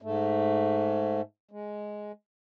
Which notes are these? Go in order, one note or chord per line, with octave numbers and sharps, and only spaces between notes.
G#2 A3
G#3